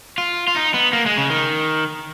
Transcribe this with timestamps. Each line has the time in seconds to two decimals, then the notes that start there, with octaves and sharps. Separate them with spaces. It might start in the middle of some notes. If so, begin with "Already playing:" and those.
0.18 F4
0.48 F4
0.56 D#4
0.74 B3
0.93 A#3
1.06 G#3
1.18 C#3
1.30 D#3